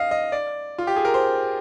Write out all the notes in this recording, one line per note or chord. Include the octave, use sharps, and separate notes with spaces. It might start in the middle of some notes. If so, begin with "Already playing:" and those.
Already playing: D#5 F5
D#5
D5
F4
G4
G#4
A#4
C5